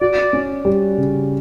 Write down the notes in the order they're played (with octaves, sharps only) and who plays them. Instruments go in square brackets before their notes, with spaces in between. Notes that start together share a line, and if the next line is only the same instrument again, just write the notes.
[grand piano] F#4 [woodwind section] D5
[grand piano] C#4
G3
C#3